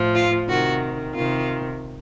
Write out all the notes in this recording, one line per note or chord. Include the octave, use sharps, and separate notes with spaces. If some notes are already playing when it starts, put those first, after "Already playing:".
Already playing: A2 F3
F4
C3 D#3 F#4
C3 D#3 F4